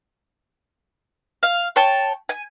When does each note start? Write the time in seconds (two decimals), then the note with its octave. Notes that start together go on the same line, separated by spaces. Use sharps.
1.43 F5
1.76 C#5 G5 A5
2.29 G#5